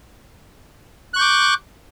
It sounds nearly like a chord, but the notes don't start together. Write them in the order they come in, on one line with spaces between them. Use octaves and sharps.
F#6 C#6 G6 D6